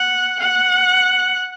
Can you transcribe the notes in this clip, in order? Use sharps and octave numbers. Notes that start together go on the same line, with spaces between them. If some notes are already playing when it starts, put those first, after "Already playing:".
Already playing: F#5
F#5